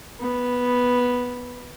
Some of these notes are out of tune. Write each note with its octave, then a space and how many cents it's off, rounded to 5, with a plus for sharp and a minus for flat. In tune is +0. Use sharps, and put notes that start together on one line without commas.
B3 -5